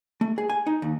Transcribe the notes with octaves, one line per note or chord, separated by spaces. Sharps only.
A3
G#4
G#5
D#4
D#2